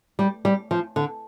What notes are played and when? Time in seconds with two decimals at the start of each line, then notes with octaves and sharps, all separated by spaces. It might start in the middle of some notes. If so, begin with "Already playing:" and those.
0.19 G3
0.45 G3
0.71 F3
0.96 D3